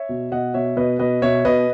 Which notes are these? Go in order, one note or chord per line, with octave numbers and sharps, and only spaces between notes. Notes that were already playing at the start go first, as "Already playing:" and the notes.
Already playing: C#5 E5
B2
B2 D#5 F#5
B2 C#5 E5
B2 B4 D#5
B2 B4 D#5
B2 C#5 E5
B2 B4 D#5